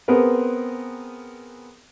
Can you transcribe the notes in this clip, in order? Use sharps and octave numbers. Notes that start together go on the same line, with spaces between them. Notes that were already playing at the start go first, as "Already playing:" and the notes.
B3 C4 G#4 A#4 B4